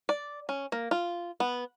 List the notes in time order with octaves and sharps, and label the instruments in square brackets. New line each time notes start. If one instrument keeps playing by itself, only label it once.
[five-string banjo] D5
C#4
A#3
F4
B3